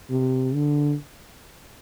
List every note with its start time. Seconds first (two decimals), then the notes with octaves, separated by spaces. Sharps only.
0.10 C3
0.54 D3